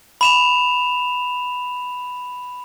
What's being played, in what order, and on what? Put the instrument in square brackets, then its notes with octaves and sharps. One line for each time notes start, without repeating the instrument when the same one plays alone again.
[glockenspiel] B5 E7 F7